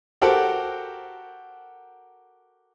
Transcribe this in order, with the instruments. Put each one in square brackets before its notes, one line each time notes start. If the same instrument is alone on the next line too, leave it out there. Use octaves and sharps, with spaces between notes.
[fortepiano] F#4 G4 A4 A#4 C5 F#5